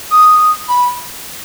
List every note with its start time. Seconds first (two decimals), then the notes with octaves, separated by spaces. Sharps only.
0.11 D#6
0.69 B5